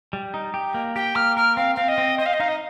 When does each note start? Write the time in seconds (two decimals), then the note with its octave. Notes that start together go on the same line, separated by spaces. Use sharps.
0.13 G3
0.34 D#4
0.54 G4
0.74 A#3
0.96 G4 G5
1.15 A#3 F6
1.37 A#4 F6
1.57 C4 F5
1.76 C4 F5
1.88 D#5
1.98 C4
2.18 C5 D#5
2.26 F5
2.33 D#5
2.40 D#4 F5
2.48 D#5